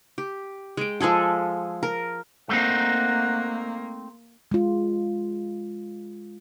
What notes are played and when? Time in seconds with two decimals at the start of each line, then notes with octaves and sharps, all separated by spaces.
0.18 G4
0.77 G#3 G5
1.01 F3 G#3 G#4 A4
1.83 A#4
2.49 A3 A#3 C4 D#4 F#5
4.52 G#3 F4